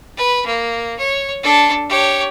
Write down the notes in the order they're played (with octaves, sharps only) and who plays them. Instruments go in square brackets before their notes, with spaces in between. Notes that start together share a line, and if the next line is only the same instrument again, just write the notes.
[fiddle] B4
A#3
C#5
D4 A4
G4 C#5